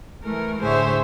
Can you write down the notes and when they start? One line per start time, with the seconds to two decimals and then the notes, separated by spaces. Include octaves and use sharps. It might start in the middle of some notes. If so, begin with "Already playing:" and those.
0.24 E3 A3 A#4
0.61 A2 D3 G#4 C5 C#5 E5